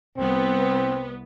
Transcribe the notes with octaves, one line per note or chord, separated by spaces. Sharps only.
C2 B3 C4